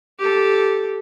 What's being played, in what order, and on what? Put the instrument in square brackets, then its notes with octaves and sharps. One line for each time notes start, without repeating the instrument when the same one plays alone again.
[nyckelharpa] G4 A4